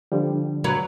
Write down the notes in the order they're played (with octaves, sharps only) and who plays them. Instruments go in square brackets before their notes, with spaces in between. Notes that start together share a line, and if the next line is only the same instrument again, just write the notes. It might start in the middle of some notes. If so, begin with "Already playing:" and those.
[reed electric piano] D3 F3 G3
[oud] F#3 B4